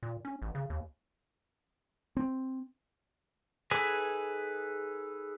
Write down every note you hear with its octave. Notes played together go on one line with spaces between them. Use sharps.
A#2
C#4
A1
C#3
D#2
C4
D#4 G#4 A4 B4 G#5